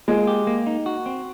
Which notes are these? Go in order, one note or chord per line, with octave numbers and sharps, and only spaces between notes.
G#3 A#3
G4
A#3
D#4
F#4
C4